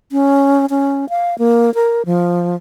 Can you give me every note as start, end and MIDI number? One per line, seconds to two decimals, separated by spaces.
0.12 0.66 61
0.70 1.09 61
1.09 1.37 77
1.38 1.73 58
1.75 2.02 70
2.06 2.56 53